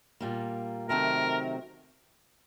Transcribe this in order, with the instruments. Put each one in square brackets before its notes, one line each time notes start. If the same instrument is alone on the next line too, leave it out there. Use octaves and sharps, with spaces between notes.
[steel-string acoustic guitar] A#2 G3 A#3
[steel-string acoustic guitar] C3 D#3 F#3 A3 C4 [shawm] A#4